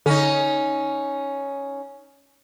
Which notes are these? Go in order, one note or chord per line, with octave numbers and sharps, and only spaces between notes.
D3 C#4 D#4